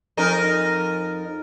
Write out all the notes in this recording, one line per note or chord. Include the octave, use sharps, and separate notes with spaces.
F2 D#4 A#4